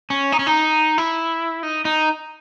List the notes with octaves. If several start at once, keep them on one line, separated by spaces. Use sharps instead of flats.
C#4
D#4
C#4
D#4
E4
D#4
D#4